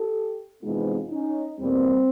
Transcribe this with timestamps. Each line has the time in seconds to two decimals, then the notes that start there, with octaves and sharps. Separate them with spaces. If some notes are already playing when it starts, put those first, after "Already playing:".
Already playing: G4 A4
0.62 F2 C3 E3 G#3 B3 D#4 F4
1.10 C#4 D#4
1.58 E2 B2 G3 A#3 C4